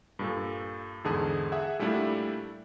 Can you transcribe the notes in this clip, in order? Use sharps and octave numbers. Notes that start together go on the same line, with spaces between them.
G2 A#2 A4
E2 G#2 D3 G#4 A5 D#6
G#4 E5 F#5
A#2 G3 A3 D4 E4